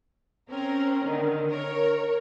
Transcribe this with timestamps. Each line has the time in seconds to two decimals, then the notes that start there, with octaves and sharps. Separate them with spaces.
0.50 C4 C#4 A#4
1.03 D3 D#3
1.49 A#4 C#5